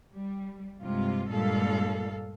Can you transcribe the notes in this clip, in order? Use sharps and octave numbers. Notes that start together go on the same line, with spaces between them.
G3
G2 C3 G#3 F4
G2 A#2 G#3 A4 F5